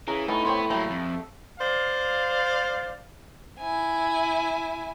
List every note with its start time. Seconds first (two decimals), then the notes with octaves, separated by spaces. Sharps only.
0.08 C#3 E3 A#5
0.28 A2 B3 C#4 D#4
0.45 B3 C4 C#5 C6
0.70 F#3 G3 A3 A#3 A#5
0.90 F2
1.59 C5 D5 F5
3.59 E4 G#5